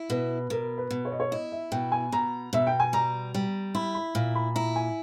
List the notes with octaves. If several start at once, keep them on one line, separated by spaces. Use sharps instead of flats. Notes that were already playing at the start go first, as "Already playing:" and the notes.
Already playing: E4
B2 B4
B2 A#4
B4
B2
C#5
D#5
C#5
E4 D#5
E5
B2 G5
G#5
B2 A#5
B2 E5
G5
G#5
G3 A#5
G3
E4 B5
B5
A#2
B5
E4 A#5
G#5